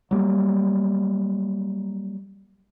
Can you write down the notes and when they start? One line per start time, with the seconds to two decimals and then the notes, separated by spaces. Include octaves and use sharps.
0.11 F#3 G3 A#3